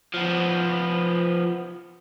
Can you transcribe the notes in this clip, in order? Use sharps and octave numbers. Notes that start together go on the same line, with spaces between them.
F3 B3